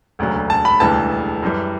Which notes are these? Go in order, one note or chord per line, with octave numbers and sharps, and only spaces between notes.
E1 D2 C#3 F#3
A5
B5
E1 D2 C#3 E3 G3 A5
F#2 E3 G3